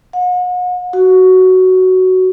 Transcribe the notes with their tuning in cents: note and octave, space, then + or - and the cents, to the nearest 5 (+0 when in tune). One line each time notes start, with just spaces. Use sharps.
F#5 -40
F#4 +10